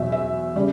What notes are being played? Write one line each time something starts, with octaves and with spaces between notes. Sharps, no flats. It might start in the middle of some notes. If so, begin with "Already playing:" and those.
Already playing: E2 B2 F#3 E5
E5
C#3 G3 D5